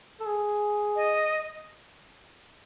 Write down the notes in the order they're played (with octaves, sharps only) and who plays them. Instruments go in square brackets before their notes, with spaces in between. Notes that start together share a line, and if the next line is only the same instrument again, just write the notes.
[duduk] A4
G#4
[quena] D#5